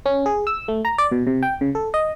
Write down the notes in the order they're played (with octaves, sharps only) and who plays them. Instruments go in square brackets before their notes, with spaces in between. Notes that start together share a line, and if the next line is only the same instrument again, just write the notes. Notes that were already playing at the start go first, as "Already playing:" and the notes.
[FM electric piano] C#4
G#4
E6
A3
A#5
D5
B2
C3
G5
C#3
A4
D#5